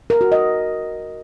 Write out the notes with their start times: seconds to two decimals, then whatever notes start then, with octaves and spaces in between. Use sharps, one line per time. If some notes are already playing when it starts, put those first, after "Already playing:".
0.10 A#4
0.21 F#4
0.32 D#5